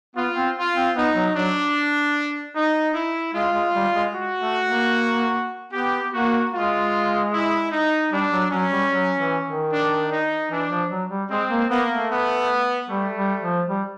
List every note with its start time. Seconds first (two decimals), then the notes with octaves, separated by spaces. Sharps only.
0.16 B3 F4
0.36 C4
0.56 F4
0.76 C4
0.96 B3 D#4
1.15 F#3
1.35 F#3 D4
2.54 D#4
2.94 E4
3.34 G#3 F4
3.54 G#3
3.74 G3
3.94 G#3
4.14 F#4
4.40 A3
4.67 A#3
5.72 B3 G4
6.12 A#3 F#4
6.52 G#3 F4
7.32 E4
7.71 D#4
8.11 G3 D4
8.31 F#3
8.51 F#3 C#4
8.71 G3
8.91 F#3
9.18 E3
9.44 D#3
9.71 D4
10.11 D#4
10.50 E3 D4
10.69 F3
10.90 F#3
11.10 G3
11.30 G#3 C4
11.50 A#3
11.69 A#3 B3
11.89 A3
12.09 B3
12.89 G3 A3
13.16 G3
13.42 F3
13.68 G3